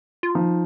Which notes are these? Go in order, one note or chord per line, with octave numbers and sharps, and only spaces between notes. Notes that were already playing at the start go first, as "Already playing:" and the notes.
F4
F3 D#4